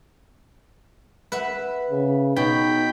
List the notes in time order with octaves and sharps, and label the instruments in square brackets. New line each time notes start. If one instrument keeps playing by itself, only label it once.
[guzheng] B4 E5 F#5
[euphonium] C#3
[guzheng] B2 [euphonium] D#4 [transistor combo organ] G5 B5